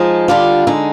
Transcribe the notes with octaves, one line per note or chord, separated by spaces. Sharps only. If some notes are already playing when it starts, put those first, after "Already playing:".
Already playing: F3 G#3 D#4
D3 G3 D4 F4
D3 G#3 D#4